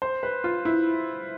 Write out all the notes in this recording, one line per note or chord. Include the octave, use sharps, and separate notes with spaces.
C5
B4
F4
E4